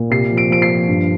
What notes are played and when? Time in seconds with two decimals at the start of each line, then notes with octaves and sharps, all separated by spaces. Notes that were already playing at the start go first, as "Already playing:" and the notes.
Already playing: A#2
0.10 C3 C7
0.31 F3
0.37 D7
0.50 F3 D7
0.62 C7
0.70 F3
0.88 G2